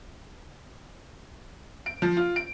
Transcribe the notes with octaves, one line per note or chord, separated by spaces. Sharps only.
D7
F3
F4
D7